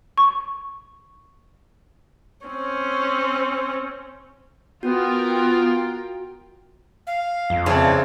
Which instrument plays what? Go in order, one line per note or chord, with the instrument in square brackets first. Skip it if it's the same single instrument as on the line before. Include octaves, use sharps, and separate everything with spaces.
[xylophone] C#6
[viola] C4 C#4
[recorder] B3 [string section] F4 A#4 G5 [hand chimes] F#4
[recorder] F5
[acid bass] F2
[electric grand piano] C#3 C4 [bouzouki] E3 D4 [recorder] C#5